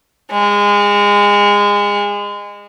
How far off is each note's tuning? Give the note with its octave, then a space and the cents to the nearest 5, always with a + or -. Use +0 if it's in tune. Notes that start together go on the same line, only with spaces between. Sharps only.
G#3 -25